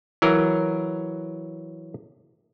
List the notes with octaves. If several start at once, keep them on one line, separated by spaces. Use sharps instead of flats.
E3 F#3 A#4